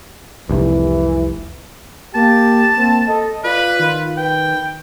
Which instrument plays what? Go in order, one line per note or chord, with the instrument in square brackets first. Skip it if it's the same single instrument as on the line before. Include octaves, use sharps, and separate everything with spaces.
[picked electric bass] F1 C2 [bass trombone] E3
[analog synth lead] A#3 [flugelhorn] G4 [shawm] A5
[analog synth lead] A#3 [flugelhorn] C4
[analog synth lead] A4 [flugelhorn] D#5
[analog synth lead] F4 [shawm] B4 [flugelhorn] D5
[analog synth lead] D#3 [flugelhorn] F4
[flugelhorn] B4 [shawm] G5